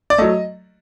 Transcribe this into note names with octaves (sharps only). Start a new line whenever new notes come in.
D5
F#3 A3 D#5